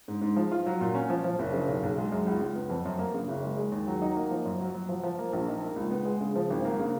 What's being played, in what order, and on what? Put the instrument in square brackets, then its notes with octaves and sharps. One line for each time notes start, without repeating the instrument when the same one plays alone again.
[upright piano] G#2
G#2
F3
F4
F#3
A#2
C#4
F3
F3
F#1
C#3
B1
B1
G#3
F#2
C#2
C#2
B3
F2
F#2
A#3
C#3
F#1
G#3
G#3
D#2
F#3
D#4
A#3
F3
F#2
F#3
F#3
F3
F3
A#3
A#1
D#4
A#3
C#2
B3
G#3
C#3
F3
G#1
A#3
C#3